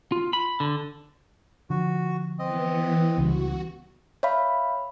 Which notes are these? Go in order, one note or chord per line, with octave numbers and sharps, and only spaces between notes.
F4
B5
D3
D3 F3 F#4
E3 B3 C4 D#5
C#2 C#3 G3 F#4
C#5 E5 F5 B5